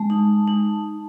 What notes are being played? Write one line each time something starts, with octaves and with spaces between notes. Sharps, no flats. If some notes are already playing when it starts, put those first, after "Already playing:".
Already playing: G#3 A5
D#4
D#4